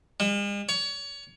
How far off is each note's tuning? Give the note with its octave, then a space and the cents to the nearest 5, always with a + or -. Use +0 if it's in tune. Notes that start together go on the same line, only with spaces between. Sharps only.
G#3 -45
C#5 +25